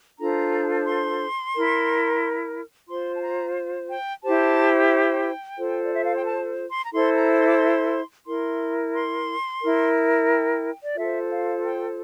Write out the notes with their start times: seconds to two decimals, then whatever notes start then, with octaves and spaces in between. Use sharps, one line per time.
0.18 D4 F4 A4 C5 A#5
0.86 C6
1.54 E4 A#4
2.88 F4 C5 C6
3.15 A5
3.22 A#5
3.89 G5
4.22 E4 G4 C5 A5
4.90 G5
5.57 F4 A4 C5
5.85 D5
5.95 E5
6.05 F5
6.15 G5
6.24 A5
6.70 C6
6.83 A#5
6.92 E4 A4 C5 C6
7.15 A#5
7.37 C6
7.47 D6
7.56 C6
8.27 E4 A#4 C6
8.94 C6
9.62 E4 A#4
10.29 G5
10.83 D5
10.96 F4 A4 C5 E5
11.30 F5
11.64 G5